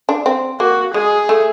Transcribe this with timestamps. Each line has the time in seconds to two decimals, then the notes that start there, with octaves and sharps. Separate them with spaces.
0.09 D4
0.26 C4
0.60 A#3 F#4
0.94 G#3 G#4
1.29 A3